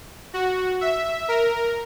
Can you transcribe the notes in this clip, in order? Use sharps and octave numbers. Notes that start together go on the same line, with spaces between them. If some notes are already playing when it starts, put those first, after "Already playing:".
F#4
E5
A#4